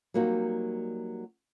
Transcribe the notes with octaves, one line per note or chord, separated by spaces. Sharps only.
F#3 G3 A#3 C4 D#4 F#4